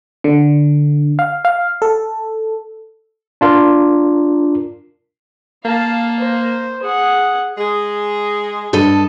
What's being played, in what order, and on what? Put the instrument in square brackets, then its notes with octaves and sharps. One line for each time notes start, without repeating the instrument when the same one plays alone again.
[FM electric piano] D3
F5
F5
A4
[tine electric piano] D4 F4 A#4
[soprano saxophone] A#3 [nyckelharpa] F5 A5
[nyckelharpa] C5
G#4 F#5
[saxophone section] G#3 G#4
[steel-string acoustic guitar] G2 A4 D#5